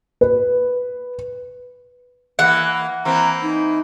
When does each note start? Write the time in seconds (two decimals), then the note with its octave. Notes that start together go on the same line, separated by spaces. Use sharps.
0.21 B4
2.39 E3 A#3 F#5
3.05 E3 A#3 C4 A#5
3.42 D#4